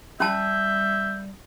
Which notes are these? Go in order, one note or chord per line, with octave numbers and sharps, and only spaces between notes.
G3 C#4 E5 A5 G6